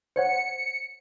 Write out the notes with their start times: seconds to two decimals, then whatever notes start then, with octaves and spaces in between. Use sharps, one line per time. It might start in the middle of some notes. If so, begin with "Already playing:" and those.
0.16 C5 C#5 F#5 C#7